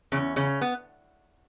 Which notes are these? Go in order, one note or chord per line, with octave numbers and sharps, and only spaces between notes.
E2 C#3 C#4
C#3 C#4
B3